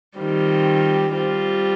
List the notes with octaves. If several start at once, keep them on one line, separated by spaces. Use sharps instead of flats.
D#3 G3 C4 F4
G3 C4 F4